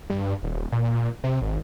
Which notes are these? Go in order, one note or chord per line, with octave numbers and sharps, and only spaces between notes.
G2
D#1
A#2
C3
G#1